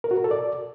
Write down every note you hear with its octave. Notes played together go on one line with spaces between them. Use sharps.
A#4
F#4
A#4
A4
D5